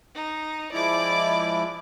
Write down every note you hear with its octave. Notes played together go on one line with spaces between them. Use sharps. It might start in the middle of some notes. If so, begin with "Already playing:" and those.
D#4
F3 G#3 E4 D5 D6